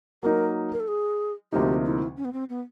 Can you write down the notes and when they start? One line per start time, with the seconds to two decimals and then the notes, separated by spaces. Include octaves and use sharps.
0.23 F#3 A#3 D#4 A#4
0.73 A#4
0.80 A4
0.88 G#4
1.52 D2 C3 F3 A#3 D#4 G4
1.85 E4
2.17 C#4
2.25 B3
2.33 C4
2.49 B3